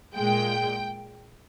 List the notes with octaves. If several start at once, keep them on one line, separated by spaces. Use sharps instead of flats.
A#2 G#3 G5